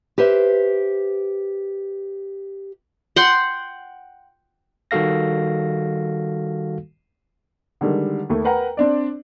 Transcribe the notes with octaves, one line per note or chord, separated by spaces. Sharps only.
G4 B4 C5 E5
F#5 G5 C6
D#3 G3 F#4 A4 F5 A#6
D3 D#3 G3 G#3
D#2 A3
A#4 B4 F#5 G5 A#5
C4 D4 D5